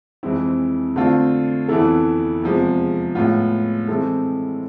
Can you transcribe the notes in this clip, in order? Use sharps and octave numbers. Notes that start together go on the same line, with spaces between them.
F2 E3 G#3 C4 E4
D3 A3 C4 F4
F2 E3 B3 E4 A4
E2 C3 F3 G#3
A2 G#3 B3 F4
E3 G#3 C4 E4 A4